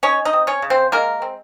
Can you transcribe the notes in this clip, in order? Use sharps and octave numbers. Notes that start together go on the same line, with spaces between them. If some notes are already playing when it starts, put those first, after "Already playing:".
C#4 D#4 C#5
D#4 D#5
C4
C#4 C#5
C#3
C4 C5
G#3 A#3 A#4
C4